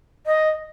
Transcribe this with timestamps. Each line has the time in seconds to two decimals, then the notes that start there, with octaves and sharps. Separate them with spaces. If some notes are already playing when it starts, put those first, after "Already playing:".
0.26 D#5